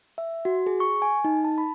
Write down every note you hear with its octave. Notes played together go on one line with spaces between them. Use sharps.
E5
F#4
G#4
C#6
G#5
D#4
A5
B5